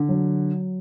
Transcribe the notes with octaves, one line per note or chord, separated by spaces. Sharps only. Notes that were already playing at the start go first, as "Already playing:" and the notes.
Already playing: D3
F#3